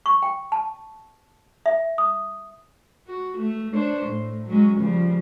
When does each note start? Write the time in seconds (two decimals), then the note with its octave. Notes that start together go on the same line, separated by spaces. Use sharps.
0.06 C#6
0.22 G5
0.52 A5
1.66 E5
1.98 D#6
3.07 F#4
3.38 A3
3.72 D4 C5 C#5
4.06 A2
4.48 F#3 G#3 C#4
4.80 C#3 F3 G3